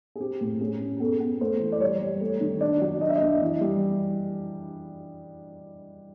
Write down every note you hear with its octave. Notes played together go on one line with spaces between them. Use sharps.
G#4
C4 G4
A2
C#4 G#4
C#4
B3 A4
B3
A3 C5
E3
D5
G3 C#5
G3
A3
D#3
D4 D5
F#3
D4 D#5
E5
D#5
D4
E3
G3